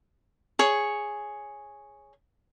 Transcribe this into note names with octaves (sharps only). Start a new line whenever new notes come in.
G#4 C#5